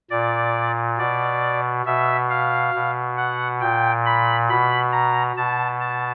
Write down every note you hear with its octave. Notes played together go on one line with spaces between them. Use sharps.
A#2 D5
B2 D5
B2 E5
F5
B2
F#5
A#2 G5
B5
B2 B5
A#5
B2 A5
A5